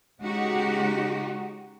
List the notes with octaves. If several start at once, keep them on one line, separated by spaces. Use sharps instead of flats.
C#3 G#3 D#4 F#4 G4